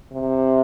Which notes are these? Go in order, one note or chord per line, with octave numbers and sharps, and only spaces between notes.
C3